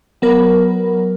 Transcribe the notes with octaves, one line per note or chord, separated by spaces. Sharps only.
F#3 B3 A#4